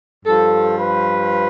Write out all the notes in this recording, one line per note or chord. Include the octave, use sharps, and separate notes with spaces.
G2 F3 A4
B4